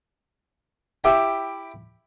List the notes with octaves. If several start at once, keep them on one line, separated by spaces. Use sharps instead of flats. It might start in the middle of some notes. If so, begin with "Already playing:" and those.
E4 G4 E5 G5